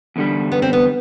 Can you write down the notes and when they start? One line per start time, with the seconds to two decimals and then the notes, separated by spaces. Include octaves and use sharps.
0.16 E2 D3 G3
0.52 B3
0.62 C4
0.73 B3